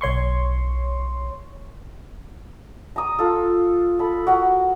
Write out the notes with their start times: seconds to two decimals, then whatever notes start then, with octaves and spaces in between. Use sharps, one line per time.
0.01 B1 C#5 C6 C#6
2.96 A#5 D#6
3.19 F4 A4
3.99 A4 B5
4.27 F#4 A#4 F#5